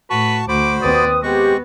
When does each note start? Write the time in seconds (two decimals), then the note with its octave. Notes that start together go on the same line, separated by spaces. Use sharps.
0.10 A2 F#4 B4 A5 C#6
0.49 D2 F#4 C5 B5 D6
0.83 D#2 C4 B4 D5 D#6
1.23 G#3 B3 C4 F#4 G4 C#6